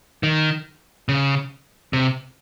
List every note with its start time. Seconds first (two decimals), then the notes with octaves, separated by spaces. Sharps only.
0.23 D#3
1.09 C#3
1.93 C3